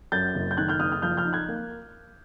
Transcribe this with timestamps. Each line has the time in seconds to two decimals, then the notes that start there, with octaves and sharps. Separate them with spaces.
0.12 F#2 G6 A6
0.35 F#1
0.51 G6
0.57 D#3 F#6 G#6
0.68 F6 G6
0.80 F#1 D#6 F6
0.92 D#6 F6
1.02 F3 F6 G6
1.17 F6 G6
1.25 D#4
1.33 F#6 G#6
1.48 A#3